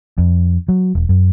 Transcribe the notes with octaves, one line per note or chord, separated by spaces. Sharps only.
F2
F#3
E1
F#2